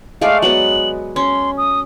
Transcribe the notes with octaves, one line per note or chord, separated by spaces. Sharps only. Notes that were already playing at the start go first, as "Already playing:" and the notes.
G#3 A3 D5 F5
F#3 G#3 B3 F#7
C#4 C6
D#6